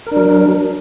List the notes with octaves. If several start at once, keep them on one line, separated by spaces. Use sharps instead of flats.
F#3 D4 A#4